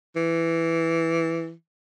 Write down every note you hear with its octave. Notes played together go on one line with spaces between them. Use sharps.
E3